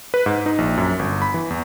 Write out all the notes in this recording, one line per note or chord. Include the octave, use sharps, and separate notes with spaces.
B4
G#2
D#4
A#1
F#2
G1
B5
E3
E2